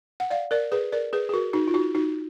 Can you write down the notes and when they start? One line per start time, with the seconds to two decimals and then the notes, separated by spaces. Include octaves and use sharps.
0.20 F#5
0.30 D5 F5
0.51 A#4 D5
0.72 G#4 B4
0.92 A#4 D5
1.13 G#4 B4
1.29 G#4
1.33 F#4 A#4
1.53 D#4 F#4
1.68 F4
1.74 D#4 F#4
1.95 D#4 F#4